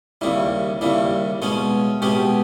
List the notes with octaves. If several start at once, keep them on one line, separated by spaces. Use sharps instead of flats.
D#2 C#3 G3 E4
D#2 C#3 G3 E4
B2 G#3 C#4
B2 G#3 C#4 G4